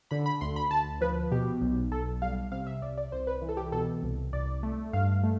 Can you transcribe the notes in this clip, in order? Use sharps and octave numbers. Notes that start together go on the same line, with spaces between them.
D3 B5
B5
D2 C6
B5
D2 A5
F3 B4
B2 G4
B1
B1 A4
G3 F5
C3 F5
E5
C2 D5
D5
C2 C5
B4
E3
A4
G4
B2 A4
C2
C2 D5
A3
G2 F5
A3